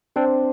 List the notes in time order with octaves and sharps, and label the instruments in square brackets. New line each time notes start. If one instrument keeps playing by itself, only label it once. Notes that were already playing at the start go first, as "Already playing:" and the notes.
[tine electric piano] C4 D4 [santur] C5